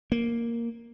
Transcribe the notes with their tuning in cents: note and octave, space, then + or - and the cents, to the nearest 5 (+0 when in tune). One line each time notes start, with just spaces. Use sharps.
A#3 +0